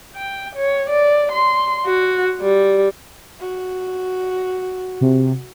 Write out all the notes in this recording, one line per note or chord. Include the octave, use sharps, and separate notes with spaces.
G5
C#5
D5
C6
F#4
G3
F#4
C3